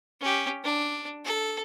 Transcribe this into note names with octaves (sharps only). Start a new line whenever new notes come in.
C#4 G4
D4
A4